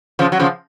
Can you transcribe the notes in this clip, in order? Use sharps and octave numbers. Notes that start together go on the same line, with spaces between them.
C#3 F3
F#3
C#3 F3